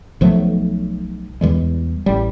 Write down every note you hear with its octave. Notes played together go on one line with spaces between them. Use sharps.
B1 F3 F#3 A3
E2 E3 G3 G#3
A1 G3